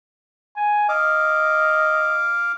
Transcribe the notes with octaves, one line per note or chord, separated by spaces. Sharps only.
G#5
D#5 F5 D6